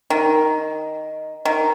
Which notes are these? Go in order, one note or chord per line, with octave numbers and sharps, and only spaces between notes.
D#3
D#3